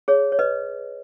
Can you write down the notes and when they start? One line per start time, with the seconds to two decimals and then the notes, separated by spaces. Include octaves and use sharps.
0.08 G#4 C#5
0.32 C#5
0.39 B4 D#5